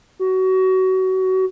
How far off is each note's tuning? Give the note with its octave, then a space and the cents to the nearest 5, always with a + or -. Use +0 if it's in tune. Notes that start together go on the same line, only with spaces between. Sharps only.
F#4 +25